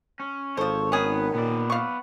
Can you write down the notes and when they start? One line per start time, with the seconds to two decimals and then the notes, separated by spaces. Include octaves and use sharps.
0.20 C#4
0.57 G#1 F3 A4 C5 C#5
0.92 D#3 B3 C#4 G#4
1.34 A#2 B3 D5
1.70 F5 C#6